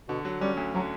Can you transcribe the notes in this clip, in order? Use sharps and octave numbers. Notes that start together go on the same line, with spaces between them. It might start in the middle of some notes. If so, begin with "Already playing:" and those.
B2 D3
F#3
G3 C#4
D2
D3 F#3